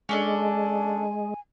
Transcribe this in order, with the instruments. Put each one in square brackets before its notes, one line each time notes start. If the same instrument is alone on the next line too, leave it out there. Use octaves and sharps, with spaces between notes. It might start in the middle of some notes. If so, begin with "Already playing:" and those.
[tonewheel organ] G#3 [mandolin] C#4 D4 A4 [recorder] G#5